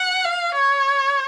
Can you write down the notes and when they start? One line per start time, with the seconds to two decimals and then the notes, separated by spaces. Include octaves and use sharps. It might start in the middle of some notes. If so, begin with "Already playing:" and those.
Already playing: F#5
0.24 F5
0.54 C#5